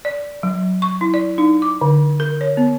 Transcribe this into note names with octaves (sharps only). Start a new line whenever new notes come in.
D5
F#3
C#6
E4
D5
D#4
D6
D3
A#4
C#5
B3